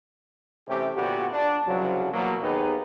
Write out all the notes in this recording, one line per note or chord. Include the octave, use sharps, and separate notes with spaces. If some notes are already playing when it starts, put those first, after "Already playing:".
C3 E3 A3 C#4 G4
A#1 A#2 D3 B3 F#4 G4
D4
C2 C#3 F3 F#3
E2 B2 F#3 A#3
D#2 B3 D#4 G4 G#4 B4